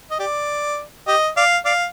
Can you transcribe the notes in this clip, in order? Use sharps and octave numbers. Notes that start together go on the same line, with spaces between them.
D#5
G4 D5
G4 D#5
D5 F5
D5 F5